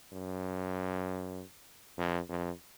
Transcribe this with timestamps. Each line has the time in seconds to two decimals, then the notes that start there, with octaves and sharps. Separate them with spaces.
0.13 F#2
1.98 F2
2.29 F2